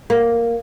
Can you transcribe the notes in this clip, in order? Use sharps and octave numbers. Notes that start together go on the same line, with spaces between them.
A#3